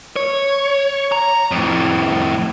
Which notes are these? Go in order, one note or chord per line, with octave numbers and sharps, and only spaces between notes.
C#5
A#5
F2 A2